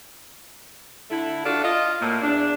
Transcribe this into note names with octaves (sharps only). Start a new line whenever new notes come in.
D3 A3 E4
D4 F4 F#4 A4 D5
F4 D#5
A2 A#3
E2 D4